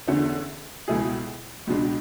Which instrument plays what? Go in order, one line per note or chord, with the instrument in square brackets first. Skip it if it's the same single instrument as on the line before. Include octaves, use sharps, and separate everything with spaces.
[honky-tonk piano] E2 D3 A3 C#4
C#2 B2 A3 E4 G#4
C#2 B2 G#3 D4